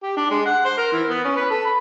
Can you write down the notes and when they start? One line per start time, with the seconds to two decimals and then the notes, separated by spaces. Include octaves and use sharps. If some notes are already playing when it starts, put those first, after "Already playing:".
0.03 G4
0.17 D4
0.31 G#3
0.45 F#5
0.65 C5
0.77 A#4
0.92 E3
1.10 B3
1.24 C#4
1.36 B4
1.50 A4
1.66 B5